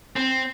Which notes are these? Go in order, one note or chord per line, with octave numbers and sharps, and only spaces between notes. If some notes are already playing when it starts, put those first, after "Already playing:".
C4